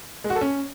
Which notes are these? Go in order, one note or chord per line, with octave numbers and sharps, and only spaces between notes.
G#3
F#4
A4
C#4